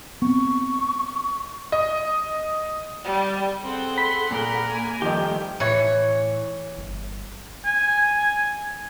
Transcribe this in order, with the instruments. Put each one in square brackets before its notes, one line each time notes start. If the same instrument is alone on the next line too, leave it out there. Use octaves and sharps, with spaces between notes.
[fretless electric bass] B3 C4 [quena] C#6
[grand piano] D#5
[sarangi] G3
[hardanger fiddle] C4 C5 [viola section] G#4 A4 F#5
[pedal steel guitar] B5 [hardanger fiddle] C6
[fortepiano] A#2 [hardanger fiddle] A#4
[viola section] A#3 G#5
[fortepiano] D#3 F3 D#5 [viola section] G3 A3 [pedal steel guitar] G4
[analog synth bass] A2 [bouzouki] E3 C#5
[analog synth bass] G1
[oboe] G#5